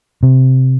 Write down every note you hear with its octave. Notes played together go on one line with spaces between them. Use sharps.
C3